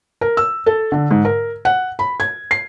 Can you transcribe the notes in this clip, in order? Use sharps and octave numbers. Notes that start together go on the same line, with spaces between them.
A#4
E6
A4
D3
G#2
A#4
F#5
B5
G#6
C7